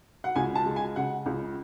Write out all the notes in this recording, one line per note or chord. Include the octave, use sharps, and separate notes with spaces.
F#5
C#2 G#5
A5
G#3
G#5
C#3 F#5
C#2